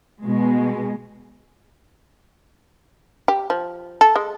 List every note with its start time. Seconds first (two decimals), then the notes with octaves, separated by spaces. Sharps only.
0.24 B2 G#3
3.28 G4
3.50 F3
4.01 A4
4.16 G#3